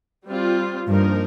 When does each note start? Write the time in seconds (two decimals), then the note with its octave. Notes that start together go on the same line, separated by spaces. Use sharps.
0.25 G3 C4 F4
0.88 G2 F3 A#3 D#4 A#4